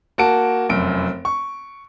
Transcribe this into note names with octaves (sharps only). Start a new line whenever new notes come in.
A#3 F#4 A5 D7
F1 F#2 D7
C#6